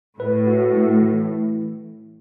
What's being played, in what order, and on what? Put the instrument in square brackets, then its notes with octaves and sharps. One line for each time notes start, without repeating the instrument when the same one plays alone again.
[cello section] A2 [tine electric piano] B4
[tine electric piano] F#4
A3
E3